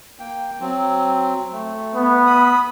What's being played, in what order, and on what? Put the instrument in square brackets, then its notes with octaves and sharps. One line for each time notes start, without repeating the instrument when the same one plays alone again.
[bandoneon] A#3 G5
F#3 C4
A3
[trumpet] B3
[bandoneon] B5 D#6